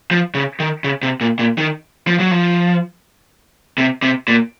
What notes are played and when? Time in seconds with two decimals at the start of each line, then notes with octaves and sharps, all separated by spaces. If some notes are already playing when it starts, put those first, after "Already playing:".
0.11 F3
0.35 C#3
0.60 D#3
0.84 C#3
1.03 C3
1.21 A#2
1.39 A#2
1.58 D#3
2.07 F3
2.20 F#3
2.31 F3
3.78 C3
4.02 C3
4.28 A#2